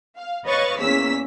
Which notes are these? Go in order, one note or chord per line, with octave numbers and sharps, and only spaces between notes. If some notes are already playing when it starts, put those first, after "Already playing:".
F5
B4 C#5 D#5 F5 C#6 A6
E2 A#3 C#4 E6 B6